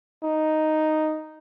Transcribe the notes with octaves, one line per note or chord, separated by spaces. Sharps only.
D#4